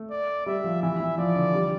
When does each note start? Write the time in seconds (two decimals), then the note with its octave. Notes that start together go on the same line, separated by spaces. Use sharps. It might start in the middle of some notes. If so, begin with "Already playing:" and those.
Already playing: A3
0.10 D5
0.46 G3 E5
0.64 F3
0.82 E3 E5
1.00 E3
1.18 F3 D5
1.36 D3
1.54 G3